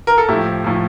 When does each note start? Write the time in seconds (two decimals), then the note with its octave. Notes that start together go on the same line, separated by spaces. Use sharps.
0.07 A#4
0.18 A4
0.28 A2 F3 E4 G4
0.64 A2 F3